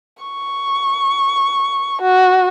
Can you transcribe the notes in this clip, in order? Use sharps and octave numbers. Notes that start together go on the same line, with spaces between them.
C#6
F#4